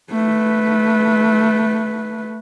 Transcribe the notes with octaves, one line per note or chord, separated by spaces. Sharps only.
A3 B4